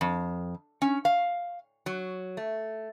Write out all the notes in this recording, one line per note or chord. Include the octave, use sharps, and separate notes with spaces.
F2
C#4
F5
F#3
A3